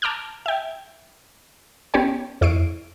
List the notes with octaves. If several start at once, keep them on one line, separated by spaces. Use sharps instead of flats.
A5 A#5 D6 F6 G6
E5 G5
B3 C#4 G4 C#5 G5
F2 E4 C#6 C7 D7